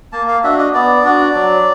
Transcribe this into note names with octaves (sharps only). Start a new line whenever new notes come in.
A#3 A5
F5
D4 F#4 E5
D#5
B3 D5
D4 F#4
F#3